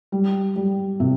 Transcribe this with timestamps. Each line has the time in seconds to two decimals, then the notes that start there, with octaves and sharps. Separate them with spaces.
0.12 G3
0.56 G3
1.00 C3